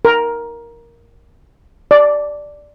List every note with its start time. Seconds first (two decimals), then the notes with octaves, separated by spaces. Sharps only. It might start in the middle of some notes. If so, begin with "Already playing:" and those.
0.05 A#4
1.91 D5